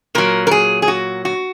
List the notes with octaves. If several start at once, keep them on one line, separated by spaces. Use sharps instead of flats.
A#2 F#3 A#4
A#4
G#4
G#4
F#4
F#4